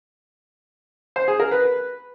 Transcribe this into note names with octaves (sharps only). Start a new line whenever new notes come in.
C5
G#4
A#4
B4